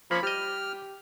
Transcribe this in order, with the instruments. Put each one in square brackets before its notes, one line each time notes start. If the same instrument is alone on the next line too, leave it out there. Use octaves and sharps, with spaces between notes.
[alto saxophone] F3 [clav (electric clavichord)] A#3 C#4 [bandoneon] B5
[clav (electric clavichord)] G3 D#5 [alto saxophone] G4 [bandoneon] F6